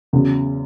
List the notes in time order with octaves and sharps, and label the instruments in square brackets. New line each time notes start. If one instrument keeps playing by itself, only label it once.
[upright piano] E2 C#3 F#3